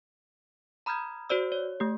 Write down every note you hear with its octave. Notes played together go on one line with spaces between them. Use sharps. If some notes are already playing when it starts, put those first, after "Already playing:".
A#5 B5 D#6 F6 G6 G#6
F#4 C5 D5 E6
C#5
A3 G4